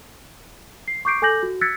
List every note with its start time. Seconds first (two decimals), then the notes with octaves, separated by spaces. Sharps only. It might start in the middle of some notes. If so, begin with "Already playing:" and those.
0.88 C7
1.05 C#6 D6 G6 C7 D7
1.22 A4 G#5 D6 G6 A#6 F#7
1.43 F#4
1.61 E6 F#6 G#6 A6 B6 C#7